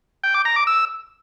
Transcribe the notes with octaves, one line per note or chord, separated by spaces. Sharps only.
G5
D6
A#5
D6
E6